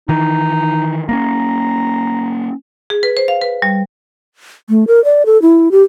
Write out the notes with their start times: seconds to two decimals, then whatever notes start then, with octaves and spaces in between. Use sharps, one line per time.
0.09 D#3 E3 D#4
1.09 A#3 B3 C#4 A#5
2.90 G#4
3.03 B4
3.17 C5
3.28 F5
3.42 B4
3.62 G3
4.69 A3
4.87 A#4
5.04 D5
5.26 A4
5.42 E4
5.72 G4